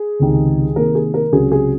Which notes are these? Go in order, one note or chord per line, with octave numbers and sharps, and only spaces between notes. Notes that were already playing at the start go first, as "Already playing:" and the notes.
Already playing: G#4
C#2 C3 D#3
C3 D#3 A#3 A#4
G#4
A#4
C#2 C3 F#3 C#4 G#4
G#4